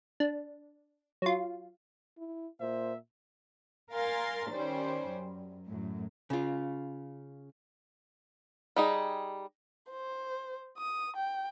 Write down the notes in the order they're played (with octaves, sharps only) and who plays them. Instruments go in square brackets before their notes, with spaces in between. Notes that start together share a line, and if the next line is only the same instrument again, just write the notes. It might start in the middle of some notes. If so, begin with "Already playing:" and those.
[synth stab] D4
F#3 F4
[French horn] E4
[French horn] A#2 [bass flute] C5 [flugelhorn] E5
[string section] A#4 F5 G#5 C6 A6
D#3 G3 C#4 C5
F#2
F#2 A2
[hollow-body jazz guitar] C#3 F4
[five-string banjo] G3 D#4 G#4
[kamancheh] C5
D#6
G5